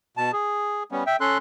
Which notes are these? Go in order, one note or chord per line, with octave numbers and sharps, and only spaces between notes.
B2 A5
G#4
G3 B3 C#4
E5 G5
C#4 A4 C6 F#6